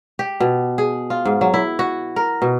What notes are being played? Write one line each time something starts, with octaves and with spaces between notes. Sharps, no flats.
G4
B2
G#4
F4
G#2
F#3
E4
F#4
A#4
B2